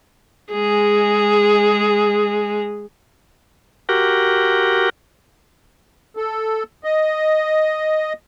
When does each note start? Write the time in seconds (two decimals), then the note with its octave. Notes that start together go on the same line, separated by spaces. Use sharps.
0.51 G#3 G#4
3.89 F#4 G4 A#4
6.17 A4
6.84 D#5